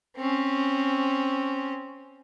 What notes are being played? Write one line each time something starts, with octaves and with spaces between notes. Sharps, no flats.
C4 C#4